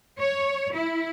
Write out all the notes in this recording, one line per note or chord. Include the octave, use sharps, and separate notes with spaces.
C#5
E4